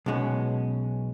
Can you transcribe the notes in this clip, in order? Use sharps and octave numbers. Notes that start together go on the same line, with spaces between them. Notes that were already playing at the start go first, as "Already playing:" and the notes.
B1 B2 G#3 C#4